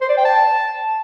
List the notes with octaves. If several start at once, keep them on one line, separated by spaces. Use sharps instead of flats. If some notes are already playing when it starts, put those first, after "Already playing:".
C5
D5
G5
A5